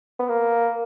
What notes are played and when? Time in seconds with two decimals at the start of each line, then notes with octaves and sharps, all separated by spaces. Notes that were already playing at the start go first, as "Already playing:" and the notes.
0.19 B3
0.29 A#3